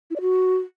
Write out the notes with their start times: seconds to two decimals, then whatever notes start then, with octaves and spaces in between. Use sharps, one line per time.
0.10 E4
0.16 D5
0.21 F#4